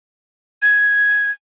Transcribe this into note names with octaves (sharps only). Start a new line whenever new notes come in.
G#6